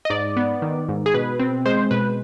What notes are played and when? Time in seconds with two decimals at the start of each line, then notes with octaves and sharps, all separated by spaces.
0.05 D#5
0.10 G#2 D5
0.37 B3
0.62 D#3
0.89 G#2
1.06 G#4
1.14 B2 B4
1.39 C4
1.66 G#3 C5
1.91 B2 B4